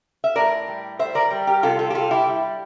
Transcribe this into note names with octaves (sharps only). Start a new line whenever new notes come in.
E5
A2 A#4 D5
G3
G3 C5 E5
A#4 D5
G3
G4 A#4
C3 F4 A4
F4 A4
G4
G3 F4 A4
E4 G4
G3